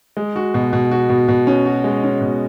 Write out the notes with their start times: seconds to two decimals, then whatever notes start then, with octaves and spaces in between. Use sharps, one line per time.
0.17 G#3
0.36 F#4
0.54 B2
0.73 B2
0.91 F#4
1.09 B2
1.28 B2
1.47 C#4
1.66 F#4
1.84 G#3
2.03 C#4
2.21 B2